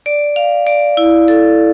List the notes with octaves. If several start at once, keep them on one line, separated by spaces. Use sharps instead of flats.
D5
F5
D5
E4
A4